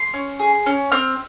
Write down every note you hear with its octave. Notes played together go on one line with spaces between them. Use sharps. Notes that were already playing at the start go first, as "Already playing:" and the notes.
Already playing: C6
C#4
G#4
C#4
C4 F6